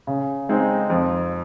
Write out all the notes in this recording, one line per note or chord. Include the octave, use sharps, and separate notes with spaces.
C#3
G#3 C4 D#4
F2